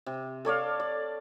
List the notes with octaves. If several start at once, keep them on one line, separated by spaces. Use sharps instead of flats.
C3
A4 C#5 D5 F5
D5